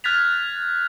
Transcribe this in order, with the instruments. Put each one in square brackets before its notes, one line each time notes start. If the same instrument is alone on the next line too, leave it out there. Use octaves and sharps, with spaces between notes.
[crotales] F6 F#6 G#6 A6 B6 F7